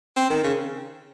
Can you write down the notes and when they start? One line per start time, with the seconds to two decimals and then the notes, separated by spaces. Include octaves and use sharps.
0.17 C4
0.30 D#3
0.44 C#3